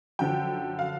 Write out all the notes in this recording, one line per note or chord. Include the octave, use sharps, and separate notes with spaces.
F#2 D3 F3 G5
F5